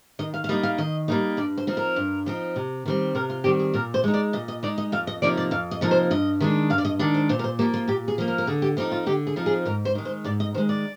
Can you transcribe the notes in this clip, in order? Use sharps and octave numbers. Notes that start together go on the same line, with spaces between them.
D#3 D#5
F5
F5
G3 A#3 D#4 D#5
F5
D#3 D#5
G3 A#3 D#4
G2 D5
C5
F3 C4 D#4
A#4
G2
F3 C4 D#4
C3
D#3 G3 C4
C3 A#4
F4
D#3 G3 C4 G4
G#4
A#2 A#4
C5
G#3 D#4
D5
A#2 D#5
D#5
G#3 D#4 D5
D#5
F2 F5
D#5
C3 F3 A#3 D#4 D5
D5
F2 F5
D#5
C3 F3 A#3 D#4
C5
G2 D#5
D#3 G#3 D4
G2 F5
D5
D#5
D#3 G#3 D4 D5
C5
A#2 C5
A#4
C5
F3 A#3 G4
F4
A#2 G4
G#4
F3 A#3
A#4
A#4
D3 G#4
G4
F3 C4 D#4 G4
F4
D3 G4
G#4
F3 C4 D#4
G#4
G#2 A#4
C5
D#3 G#3
C5
G#2 D5
D#5
D#3 G#3 C5
D5